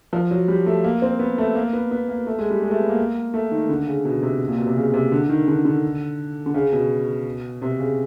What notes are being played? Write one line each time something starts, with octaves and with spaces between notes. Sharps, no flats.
F3
F#3
G3
A3
A#3
C4
B3
A3
A#3
B3
B3
A#3
A3
G#3
G3
G#3
A3
B3
A#3
A3
D#3
D3
C#3
B2
C3
A#2
B2
C3
C#3
C3
D3
D#3
D3
D3
D3
C#3
B2
C3
C#3